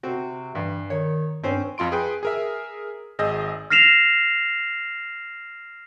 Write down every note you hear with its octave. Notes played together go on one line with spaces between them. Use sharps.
C3 C4 F#4
G2 E3
D#3 C#5
G2 C4 C#4 C5
F2 F4 C6 D7
G#4 B4 G5
G#4 A#4 E5
G#1 G#4 D#5 E6 G6 A#6
F6 A#6 C7 E7 F7